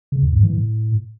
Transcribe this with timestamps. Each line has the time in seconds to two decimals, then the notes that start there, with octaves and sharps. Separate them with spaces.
0.12 C#3
0.22 E2
0.33 G#2
0.43 E3
0.53 A2